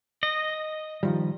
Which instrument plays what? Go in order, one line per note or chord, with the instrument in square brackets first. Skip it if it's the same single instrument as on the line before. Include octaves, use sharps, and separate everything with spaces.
[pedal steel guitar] D#5
[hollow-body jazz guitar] D#3 F3 G3